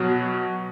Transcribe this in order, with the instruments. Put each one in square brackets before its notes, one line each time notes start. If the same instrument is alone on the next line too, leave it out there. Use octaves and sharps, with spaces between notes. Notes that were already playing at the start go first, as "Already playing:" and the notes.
Already playing: [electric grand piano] B2 F#3 F#4